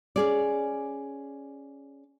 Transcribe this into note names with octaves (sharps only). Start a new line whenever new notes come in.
C#4 G#4 D5